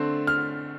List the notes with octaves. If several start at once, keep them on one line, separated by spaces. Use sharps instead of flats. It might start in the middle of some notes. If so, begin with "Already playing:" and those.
Already playing: D3 A3 C4
F6